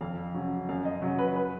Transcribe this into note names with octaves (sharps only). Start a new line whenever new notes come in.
F2 F5
C#3 F#3
F#2 F5
D#5
C#3 F#3
B4
B4